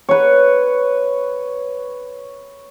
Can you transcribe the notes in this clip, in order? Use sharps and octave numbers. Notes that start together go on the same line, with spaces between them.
B4 C#5